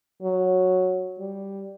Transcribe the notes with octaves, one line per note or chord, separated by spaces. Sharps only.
F#3
G3